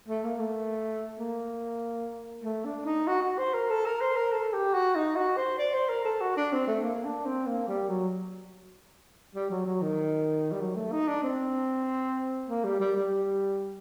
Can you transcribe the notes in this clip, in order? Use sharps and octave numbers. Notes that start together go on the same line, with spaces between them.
A3
A#3
A3
A#3
A3
D4
D#4
F#4
F#4
C5
A#4
A4
A#4
C5
A#4
A4
G4
F#4
D#4
F#4
C5
D5
C5
A#4
A4
F#4
D4
C4
A3
A#3
D4
C4
A#3
G3
F#3
G3
F#3
F#3
D#3
G3
F#3
A3
D#4
D4
C4
A#3
G3
G3
G3